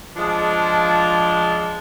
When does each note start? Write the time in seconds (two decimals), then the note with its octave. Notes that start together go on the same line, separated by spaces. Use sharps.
0.16 F3 G#3 D4